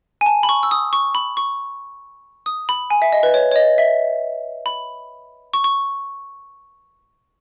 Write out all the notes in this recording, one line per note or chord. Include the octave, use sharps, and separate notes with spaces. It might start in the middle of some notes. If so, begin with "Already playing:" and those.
G#5
A5
B5
C#6
E6
D#6
C#6
B5
C#6
D#6
B5
G#5
E5
D#5
B4
C#5
C#5
D#5
E5
B5
C#6
C#6